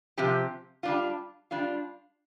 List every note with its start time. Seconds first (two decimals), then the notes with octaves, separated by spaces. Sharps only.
0.17 C3 F3 C4 G4
0.83 G3 D4 F4
1.51 G3 D4 F4